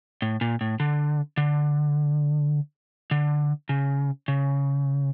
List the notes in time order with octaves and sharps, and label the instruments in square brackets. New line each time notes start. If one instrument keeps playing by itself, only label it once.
[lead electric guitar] A2
A#2
A2
D3
D3
D3
C#3
C#3